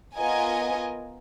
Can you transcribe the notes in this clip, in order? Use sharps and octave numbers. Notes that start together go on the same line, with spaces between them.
B3 F4 A#4 D#5 G#5